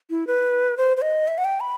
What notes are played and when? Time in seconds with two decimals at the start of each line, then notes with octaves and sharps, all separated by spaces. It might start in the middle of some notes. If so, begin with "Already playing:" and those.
0.10 E4
0.27 B4
0.77 C5
0.97 C5
1.02 D#5
1.28 E5
1.38 F#5
1.44 G5
1.60 B5